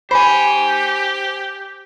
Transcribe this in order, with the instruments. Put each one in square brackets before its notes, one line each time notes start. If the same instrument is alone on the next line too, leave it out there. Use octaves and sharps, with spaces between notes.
[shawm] G4 [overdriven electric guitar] C5 G#5 [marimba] B5